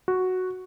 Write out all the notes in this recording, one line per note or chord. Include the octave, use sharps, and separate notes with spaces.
F#4